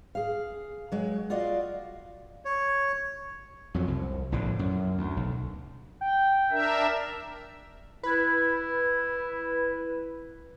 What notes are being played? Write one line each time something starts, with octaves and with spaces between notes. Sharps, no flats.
G#4 F5
F#3 G#3
F4 F#4 D5 D#5 F5
C#5
F2 F#3
C2
A#1 A2 D3
F#2
D2
B1
G5
D4 A#4 E5
E4 B4